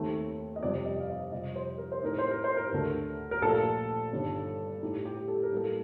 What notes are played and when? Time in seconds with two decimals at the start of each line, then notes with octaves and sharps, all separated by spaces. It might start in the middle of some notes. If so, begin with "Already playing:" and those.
Already playing: D#2 D#3 A3 C4
0.56 D#5
0.63 F2 C3 G3 C4 D5
0.86 D#5
1.00 F5
1.08 D#5
1.31 F2 C3 G3 D#5
1.56 C5
1.78 A#4
1.92 C5
2.03 A2 A3 C4 D#4 A#4
2.18 C5
2.31 A#4
2.44 C5
2.57 A#4
2.72 D2 D3 A3
3.31 A#4
3.42 A#1 A#2 F3 A3 A4
4.12 G1 G2 D#3
4.81 A2 A3 D#4 G4
5.05 G4
5.28 A4
5.43 A#4
5.52 A2 G3 A#3 A4